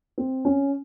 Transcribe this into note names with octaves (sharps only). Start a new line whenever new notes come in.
C4
C#4